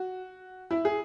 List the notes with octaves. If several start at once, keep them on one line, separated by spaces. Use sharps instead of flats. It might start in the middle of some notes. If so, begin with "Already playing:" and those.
Already playing: F#4
E4
G#4